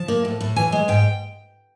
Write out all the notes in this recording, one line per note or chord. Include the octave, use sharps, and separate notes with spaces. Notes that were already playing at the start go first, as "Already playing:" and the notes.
Already playing: F3 A5
A#3
A2
A2
E3 G#5
G#3
G#2 G5